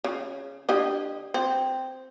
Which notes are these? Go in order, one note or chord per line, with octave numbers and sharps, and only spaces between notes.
C#3
D3 G4 D#5
C4